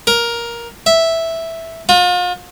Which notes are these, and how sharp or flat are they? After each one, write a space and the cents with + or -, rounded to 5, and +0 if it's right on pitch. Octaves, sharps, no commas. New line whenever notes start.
A#4 +10
E5 -5
F4 +40